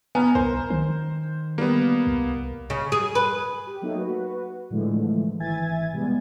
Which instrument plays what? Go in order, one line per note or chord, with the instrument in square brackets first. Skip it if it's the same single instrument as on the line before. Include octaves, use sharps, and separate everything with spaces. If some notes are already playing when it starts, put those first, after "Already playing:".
[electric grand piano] B3 [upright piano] G#5 A#5 F6
[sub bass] C2 [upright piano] A#4 A#5 [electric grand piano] C5
[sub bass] D#3 [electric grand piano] C5
[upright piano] G3 [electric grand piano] A#3 B3
[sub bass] C2
[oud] C#3
G#4
B4
[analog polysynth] G4
F#3 A3 A#3 D#4
F#4 B4
A2 D3 E3 F3 G#3 A3
G#1 E3 E5 G#5 G#6 A6
B2 G3 G#3 B3